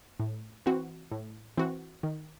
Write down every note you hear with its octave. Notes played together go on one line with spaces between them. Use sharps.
A2
E3 C4 F#4
A2
E3 C4 F#4
D#3